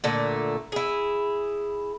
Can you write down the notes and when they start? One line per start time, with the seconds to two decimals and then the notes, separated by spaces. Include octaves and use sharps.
0.04 A#2 D3 A3
0.72 E4 G#4